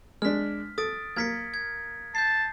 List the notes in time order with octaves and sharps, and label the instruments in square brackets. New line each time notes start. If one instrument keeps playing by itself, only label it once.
[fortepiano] G#3 D4 [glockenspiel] F6 B6
[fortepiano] A4 [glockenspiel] D#6 A6 D7
[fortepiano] A#3 F6 [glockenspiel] G#6 B6 C#7
[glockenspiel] G#6
[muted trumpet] A5 [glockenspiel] G6 C7